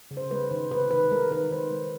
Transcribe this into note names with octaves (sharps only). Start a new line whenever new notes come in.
C#3
C5
G#3 B4
D#3 C5
C3 B4
D#3 B4
G#3 A#4
D#3 B4
D#3 C5
G#3